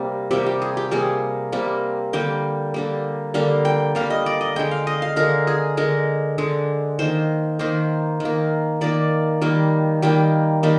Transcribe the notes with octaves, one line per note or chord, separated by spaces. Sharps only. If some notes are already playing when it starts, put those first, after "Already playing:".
Already playing: C3 G3 A#3
C3 G3 A#3 G4
G4
G#4
G4
C3 G3 A#3 G#4
C3 G3 A#3
D3 G3 A#3 G5
D3 G3 A#3
D3 G3 A#3 F5
G5
D3 G3 A#3 F5
D#5
D5
D#5
D3 G#3 G5
F5
D#5
F5
D3 G#3 A#4
G#4
D3 G#3 A#4
D3 G#3
D#3 A#3 C5
D#3 A#3 C5
D#3
A#3
D#3 A#3 D5
D#3 G3 A#3
D#3 G3 A#3 G5
D#3 G3 A#3